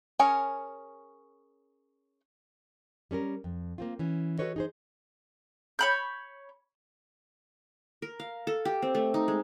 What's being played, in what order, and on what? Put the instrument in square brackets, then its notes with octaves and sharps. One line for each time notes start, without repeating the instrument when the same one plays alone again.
[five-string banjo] C#4 G#4 A#4 C#5
[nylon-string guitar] G3 C#4 A4 A#4
F2
A#3 C4 F4
E3 C#4
F#4 G4 A4 B4 C#5 D#5
D#4 G#4 C5
[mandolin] C#5 B5 G6
[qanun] A#4
F5
A4
G4
C4
A3
D#4
G#3